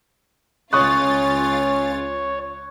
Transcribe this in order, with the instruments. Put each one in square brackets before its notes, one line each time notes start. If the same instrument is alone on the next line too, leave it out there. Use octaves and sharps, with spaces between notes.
[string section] C#2 F4 A6 [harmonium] C#4 [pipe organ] C#5 [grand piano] C#6 D#6 F#6